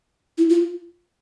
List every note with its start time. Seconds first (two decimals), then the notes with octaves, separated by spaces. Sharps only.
0.38 E4
0.50 F4